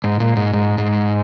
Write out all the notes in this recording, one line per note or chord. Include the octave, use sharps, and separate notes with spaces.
G#2
A#2
G#2
G#2
G#2